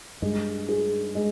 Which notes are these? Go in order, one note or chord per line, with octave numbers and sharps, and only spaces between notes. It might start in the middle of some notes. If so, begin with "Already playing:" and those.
G2 G#3
G#4
G#3